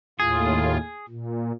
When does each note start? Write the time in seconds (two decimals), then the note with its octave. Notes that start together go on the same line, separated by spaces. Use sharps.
0.20 D#2 A2 F4 G#4
1.09 A#2